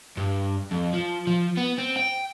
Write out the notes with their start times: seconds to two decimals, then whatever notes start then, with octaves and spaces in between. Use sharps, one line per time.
0.17 G2
0.71 F2
0.93 F3
1.27 F3
1.57 B3
1.78 C4
1.97 G5